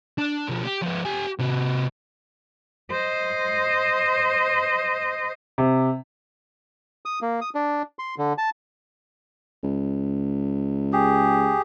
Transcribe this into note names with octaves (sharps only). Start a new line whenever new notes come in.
D4
B2 F3
G4
F3 B3
G4 G#5
C3 F#4
C5 D#5
C3
D#6
A#3
D#6
D4
C6
D3
A5
C#2
G4 G#4